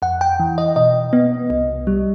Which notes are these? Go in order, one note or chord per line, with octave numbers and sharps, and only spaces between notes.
F2 F#5
G5
E3
D#5
B2 D#5
B3
C2
G3